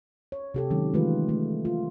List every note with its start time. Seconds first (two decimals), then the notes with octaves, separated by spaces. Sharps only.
0.32 C#5
0.54 C3 G4 A4
0.70 D#3 F#3 G#3 C#4
0.94 D#3 E3 G#3 A3 F4 B4
1.29 A3
1.65 F4